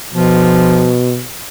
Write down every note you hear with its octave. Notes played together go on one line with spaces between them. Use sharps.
B2 F3